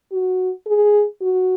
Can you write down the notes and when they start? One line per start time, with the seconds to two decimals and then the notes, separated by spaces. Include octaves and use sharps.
0.12 F#4
0.66 G#4
1.22 F#4